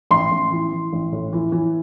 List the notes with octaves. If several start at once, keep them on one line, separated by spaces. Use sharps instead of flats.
A1 C6
A1
E3
E3
A1
A2
E3
E3